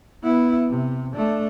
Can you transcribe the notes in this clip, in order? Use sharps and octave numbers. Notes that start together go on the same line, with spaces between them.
B3 E4
C3
A3 D4